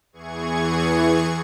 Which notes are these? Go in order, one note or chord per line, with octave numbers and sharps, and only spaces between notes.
E2 E3 G#4 C#6 G#6